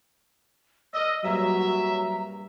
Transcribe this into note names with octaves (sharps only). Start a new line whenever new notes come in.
A#4 D5 D#5 E6
A#1 G2 F#3 E5 A#5